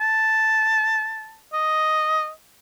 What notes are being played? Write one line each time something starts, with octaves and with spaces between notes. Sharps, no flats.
A5
D#5